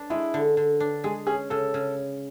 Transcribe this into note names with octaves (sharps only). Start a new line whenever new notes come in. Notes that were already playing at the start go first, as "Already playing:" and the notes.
Already playing: D4
G#3 E4
D3
D3
D4
G#3 G#4
C#4 G#4
C#3 A4
C#3